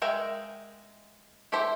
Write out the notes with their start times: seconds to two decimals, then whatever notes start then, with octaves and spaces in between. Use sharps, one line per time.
0.02 G#3 A#4 E5 F5 G5
1.52 E4 G4 A4 C5 E5